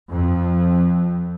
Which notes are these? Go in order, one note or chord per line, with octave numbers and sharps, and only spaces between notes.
F2